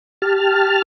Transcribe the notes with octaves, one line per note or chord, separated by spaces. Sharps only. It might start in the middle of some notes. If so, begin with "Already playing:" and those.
G4 A5 F6